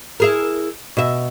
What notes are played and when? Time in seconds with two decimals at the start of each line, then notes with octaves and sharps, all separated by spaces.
0.20 E4 G#4 A#4
0.97 B2 E5